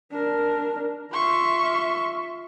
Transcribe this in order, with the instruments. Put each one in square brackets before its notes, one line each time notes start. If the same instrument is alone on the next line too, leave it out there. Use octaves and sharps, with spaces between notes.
[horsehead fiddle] D4 A#4
[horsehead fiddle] F4 E5 [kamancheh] C6 C#6